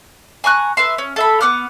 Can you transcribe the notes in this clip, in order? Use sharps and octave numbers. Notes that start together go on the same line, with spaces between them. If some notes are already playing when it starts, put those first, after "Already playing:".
G#5 A#5 C#6 F#6
B4 E5 C6
C#4
A4 E5 B5
B3 F#5 D6 F6